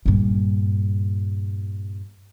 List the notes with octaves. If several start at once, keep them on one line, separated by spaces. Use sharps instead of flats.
G2 A#2